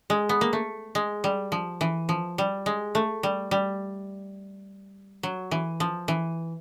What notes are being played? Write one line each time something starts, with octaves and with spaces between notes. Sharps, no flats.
G#3
B3
A#3
A3
G#3
G3
F3
E3
F3
G3
G#3
A3
G3
G3
F#3
E3
F3
E3